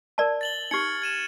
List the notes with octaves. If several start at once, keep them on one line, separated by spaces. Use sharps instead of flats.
A#4 D5 A5
A6 F#7 G7
D#4 G4 F6 G#6 C#7
G#6 D#7 E7